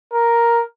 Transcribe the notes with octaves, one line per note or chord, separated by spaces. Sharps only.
A#4